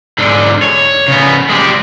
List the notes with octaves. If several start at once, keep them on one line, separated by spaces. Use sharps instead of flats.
G#2 D3
C#5
C#3 B3
G#3 G4